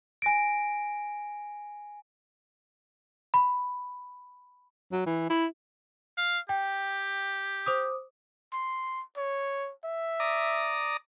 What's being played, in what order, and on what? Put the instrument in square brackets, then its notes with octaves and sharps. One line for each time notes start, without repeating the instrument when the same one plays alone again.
[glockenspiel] G#5 A#6 D7
[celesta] B5
[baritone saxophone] F#3
E3
E4
[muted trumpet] F5
[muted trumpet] G4 [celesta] G5
[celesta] C5 D6 D#6
[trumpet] C6
C#5
E5
[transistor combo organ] D5 A#5 D#6